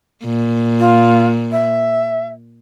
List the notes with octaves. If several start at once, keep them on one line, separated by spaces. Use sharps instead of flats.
A#2
F4
E5